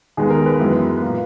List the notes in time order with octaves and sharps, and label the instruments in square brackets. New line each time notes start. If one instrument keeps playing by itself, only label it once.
[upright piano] D#2 D#3 G#3 B3 G#4
A#4
B4
F#2 E3 G#3 B3
A#2 A#3